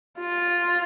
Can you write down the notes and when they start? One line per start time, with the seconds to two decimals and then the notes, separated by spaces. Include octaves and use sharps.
0.19 F4